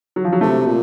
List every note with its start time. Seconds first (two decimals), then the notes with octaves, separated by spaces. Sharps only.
0.16 F#3
0.24 F3
0.32 F#3
0.41 C3 A3
0.67 A#2